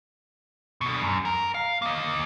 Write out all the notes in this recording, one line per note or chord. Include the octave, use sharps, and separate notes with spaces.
B2 D3
F#2
A#4
F5
A#3 D#5